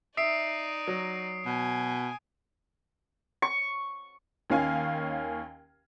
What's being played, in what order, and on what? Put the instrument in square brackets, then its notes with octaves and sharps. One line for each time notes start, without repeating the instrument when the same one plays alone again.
[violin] D#4 D5 [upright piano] E5 [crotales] D#6 C7 D7
[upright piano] F#3
[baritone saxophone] B2 [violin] G#5
[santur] C#6
[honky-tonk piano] D#2 D#3 C#4 F5 G#5